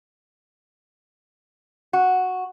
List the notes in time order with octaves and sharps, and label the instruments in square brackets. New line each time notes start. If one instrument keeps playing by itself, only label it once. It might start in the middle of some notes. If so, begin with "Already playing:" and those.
[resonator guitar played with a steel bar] F#4